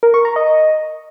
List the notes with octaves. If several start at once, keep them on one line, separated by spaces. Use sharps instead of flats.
A#4
C#6
A#5
D#5